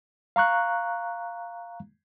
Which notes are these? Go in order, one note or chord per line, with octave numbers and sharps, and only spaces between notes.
F5 A#5 C#6 F#6